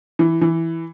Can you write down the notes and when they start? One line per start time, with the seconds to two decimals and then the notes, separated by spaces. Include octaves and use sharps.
0.19 E3
0.41 E3